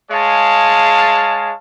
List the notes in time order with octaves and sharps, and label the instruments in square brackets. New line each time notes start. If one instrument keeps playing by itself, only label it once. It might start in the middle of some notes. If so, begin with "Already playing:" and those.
[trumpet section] G#3 G#4 C#5 F5 A5